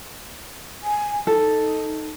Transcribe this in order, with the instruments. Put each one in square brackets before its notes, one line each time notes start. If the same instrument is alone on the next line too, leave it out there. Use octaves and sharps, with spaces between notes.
[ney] G#5
[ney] D#4 [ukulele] A4